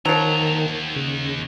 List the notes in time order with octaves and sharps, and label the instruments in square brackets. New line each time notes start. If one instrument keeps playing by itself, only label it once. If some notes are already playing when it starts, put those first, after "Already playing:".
[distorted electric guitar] D#2 A#5 [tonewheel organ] D#3 [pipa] F3 F#3
[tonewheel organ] C#3